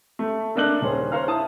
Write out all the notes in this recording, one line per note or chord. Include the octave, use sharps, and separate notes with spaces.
A3
A3 A#3 D4 D#5 F#6 F#7
D#1 C#3 C#4 C5
C5 C#5 F5 A#5 F6
E4 A5 D#6